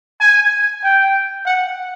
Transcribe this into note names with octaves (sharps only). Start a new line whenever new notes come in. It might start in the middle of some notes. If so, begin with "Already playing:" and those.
G#5
G5
F#5